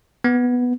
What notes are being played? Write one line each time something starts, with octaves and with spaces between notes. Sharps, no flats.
B3